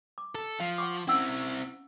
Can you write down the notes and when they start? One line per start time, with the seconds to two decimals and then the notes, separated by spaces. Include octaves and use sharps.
0.18 D6
0.35 A4
0.60 F3 F5
0.78 F#5 C#6 D6
1.08 C4 C#4 E4 F#5 E6